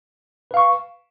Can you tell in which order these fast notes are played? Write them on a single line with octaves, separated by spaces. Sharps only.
B4 F5 C#6